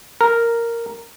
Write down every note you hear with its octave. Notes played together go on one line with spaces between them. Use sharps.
A#4